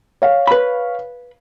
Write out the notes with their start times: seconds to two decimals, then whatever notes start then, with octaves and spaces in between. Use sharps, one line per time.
0.22 C#5 F5
0.47 B4 B5